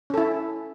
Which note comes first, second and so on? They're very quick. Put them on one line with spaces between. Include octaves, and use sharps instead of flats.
C#4 A4 E4